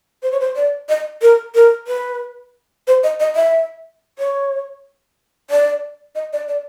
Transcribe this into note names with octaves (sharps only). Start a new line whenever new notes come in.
C5
C#5
C5
D5
D#5
A#4
A#4
B4
C5
D#5
D#5
E5
C#5
D5
D#5
D5
D5